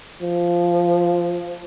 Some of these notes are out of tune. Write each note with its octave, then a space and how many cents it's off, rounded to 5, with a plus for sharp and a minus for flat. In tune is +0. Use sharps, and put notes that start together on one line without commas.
F3 -5